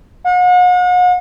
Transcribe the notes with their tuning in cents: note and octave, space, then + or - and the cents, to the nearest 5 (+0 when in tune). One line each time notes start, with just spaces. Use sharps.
F#5 -40